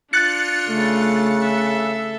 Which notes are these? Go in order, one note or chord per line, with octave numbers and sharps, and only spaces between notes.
D4 F4 F#6 A6 C#7
C#3 A3
A4 E5